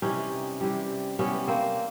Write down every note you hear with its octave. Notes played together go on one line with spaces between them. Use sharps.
C3 E3 G3 C#4 D#4
C3 E3 G3
C3 E3 G3 B3 C#4
A#3 C4